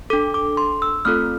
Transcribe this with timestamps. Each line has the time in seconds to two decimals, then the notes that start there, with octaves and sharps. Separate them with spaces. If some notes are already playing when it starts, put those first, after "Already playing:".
0.10 D4 A4 D6
0.34 D6
0.57 C6
0.82 E6
1.05 A3 C4 F4 A4 F6